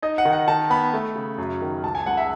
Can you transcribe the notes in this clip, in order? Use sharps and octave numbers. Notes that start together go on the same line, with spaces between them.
D#4 D#5
F#5
D#3
F#5
D#3 A5
B3 B5
A3
C#3
F#2
D#3
C#2 A5
G#5
C#2 F#5
E5